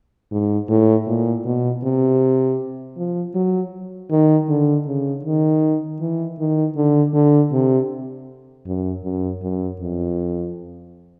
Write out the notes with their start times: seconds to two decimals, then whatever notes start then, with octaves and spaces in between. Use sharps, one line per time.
0.31 G#2
0.69 A2
1.07 A#2
1.45 B2
1.83 C3
2.97 F3
3.35 F#3
4.11 D#3
4.49 D3
4.87 C#3
5.24 D#3
6.00 E3
6.39 D#3
6.76 D3
7.14 D3
7.52 C3
8.66 F#2
9.04 F#2
9.42 F#2
9.80 F2